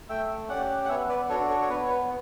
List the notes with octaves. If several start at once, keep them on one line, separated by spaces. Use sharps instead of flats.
A3 E5 G5
C#4 G4 D5 F#5
F#5
B3 C#5 E5
B4 D5
D4 F#4 A4 C#5
A4 C#5
C#5
B3 B4
C#5
B4